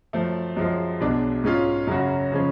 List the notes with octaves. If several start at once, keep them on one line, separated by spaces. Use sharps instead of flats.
F#2 F3 A3
F#2 F3 G#3
B1 B2 G#3 D4
G#2 G#3 C#4 F4
F#2 C#3 F#3 C#4 F#4
C#3 F3 G#3 C#4